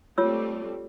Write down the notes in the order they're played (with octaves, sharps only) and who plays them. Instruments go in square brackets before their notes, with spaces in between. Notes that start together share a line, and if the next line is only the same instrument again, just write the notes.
[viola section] G3 A3 C4 [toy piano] F4 C#5 E6